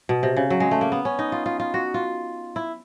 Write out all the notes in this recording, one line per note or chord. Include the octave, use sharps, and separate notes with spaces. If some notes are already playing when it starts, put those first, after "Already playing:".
B2
C3
C#3
F#3
G#3
A3
A#3
B3
C#4
D#4
F4
F4
F4
F#4
F4
E4